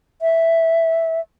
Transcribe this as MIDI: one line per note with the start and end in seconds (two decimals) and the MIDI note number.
0.22 1.20 76